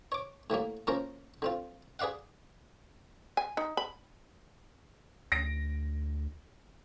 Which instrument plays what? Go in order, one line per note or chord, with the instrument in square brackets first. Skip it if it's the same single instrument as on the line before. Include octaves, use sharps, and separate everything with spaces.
[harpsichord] C#5 D6
A2 E3 F#3 A#3
F3 A#3 C#4 A#4 C5
D3 C4 F4
G#4 B4 D5 F5 F#5
[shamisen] G#5
D#4
B5
[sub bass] D2 [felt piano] A#6 D7